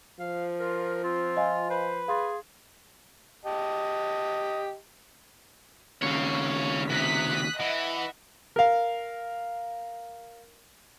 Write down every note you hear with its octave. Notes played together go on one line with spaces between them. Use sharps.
F3 F5
F4 A#4
C4 F4
D#5 F5 G#5
B4 C5
G#4 F5 C6 A6
G4 D#5 A5
D#2 C#3 C#5 F5
C3 D#6 F#6 B6
E3 D#5 E5 F#5
A#4 F5